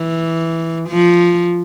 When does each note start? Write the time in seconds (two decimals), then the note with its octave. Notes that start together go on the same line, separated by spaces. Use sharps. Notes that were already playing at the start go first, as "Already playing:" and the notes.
Already playing: E3
0.89 F3